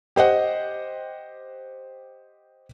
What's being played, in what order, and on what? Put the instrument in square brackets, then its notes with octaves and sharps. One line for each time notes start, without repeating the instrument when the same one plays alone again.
[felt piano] G4 C5 D#5 F#5